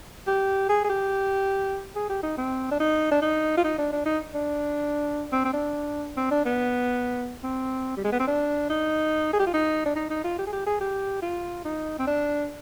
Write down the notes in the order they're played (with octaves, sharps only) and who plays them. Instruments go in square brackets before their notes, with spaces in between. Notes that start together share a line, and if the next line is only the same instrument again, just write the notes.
[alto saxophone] G4
G#4
G#4
G4
G#4
G4
D#4
C4
D4
D#4
D4
D#4
F4
D#4
D4
D4
D#4
D4
C4
C4
D4
C4
D4
B3
C4
G3
G#3
B3
C4
D4
D#4
G#4
G4
F4
D#4
D4
D#4
D#4
F4
G4
G#4
G4
G#4
G4
F4
D#4
C4
D4